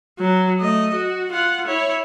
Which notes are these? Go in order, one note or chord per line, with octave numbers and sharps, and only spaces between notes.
F#3
A3 D#5
F#4
F4 F#5
E4 C#5